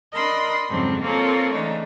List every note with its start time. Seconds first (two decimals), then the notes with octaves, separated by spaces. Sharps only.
0.14 D4 A#4 D#5 B5 C6
0.69 F2 G#2 C#3 F#3 C4 D4
1.02 A#3 C4 F4 A4 A#4 C#5
1.53 C#3 E3 A3 D4 D#4